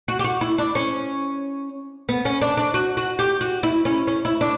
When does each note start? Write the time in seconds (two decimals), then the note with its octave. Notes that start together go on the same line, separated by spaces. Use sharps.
0.08 F#4
0.19 G4
0.24 F#4
0.41 E4
0.58 D4
0.75 C#4
2.09 B3
2.25 C#4
2.42 D4
2.57 D4
2.74 F#4
2.97 F#4
3.19 G4
3.41 F#4
3.63 E4
3.85 C#4
4.07 C#4
4.25 E4
4.41 D4